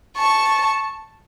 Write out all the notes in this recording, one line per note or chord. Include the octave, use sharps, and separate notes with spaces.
A5 C#6